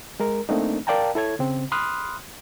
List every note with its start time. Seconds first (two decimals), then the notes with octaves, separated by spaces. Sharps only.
0.20 G#3 A#4
0.49 A3 A#3 C4 D4 D#4
0.87 A#4 D5 F5 G5 A5 A#5
1.15 E4 A4 C#5 G#6
1.39 C#3 C4
1.72 B5 C6 D#6 F6 F#6